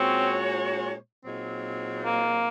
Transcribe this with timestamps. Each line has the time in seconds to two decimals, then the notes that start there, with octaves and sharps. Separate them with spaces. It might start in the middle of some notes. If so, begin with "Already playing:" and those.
Already playing: A#2 G#3 C4 C#4 F#4 C#5
1.25 A#2 F#3 C4 D#4 G#4
2.05 A#3